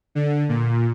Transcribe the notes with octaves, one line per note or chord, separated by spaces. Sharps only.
D3
A#2